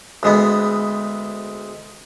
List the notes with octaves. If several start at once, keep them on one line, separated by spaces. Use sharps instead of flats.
D2 G#3 B3